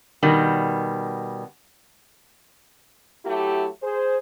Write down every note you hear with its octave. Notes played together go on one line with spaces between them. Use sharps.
B2 D#3 G3
F#3 A3 E4 G4
G#4 C5